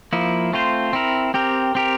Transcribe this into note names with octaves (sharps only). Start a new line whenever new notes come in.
F3 A#3 E4
A3 C4 F4 C5
C4 E4 A#4
C4 G4 A#4
C4 G4 A#4